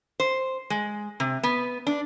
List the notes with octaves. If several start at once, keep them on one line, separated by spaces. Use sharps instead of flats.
C5
G#3
C3
B3
D4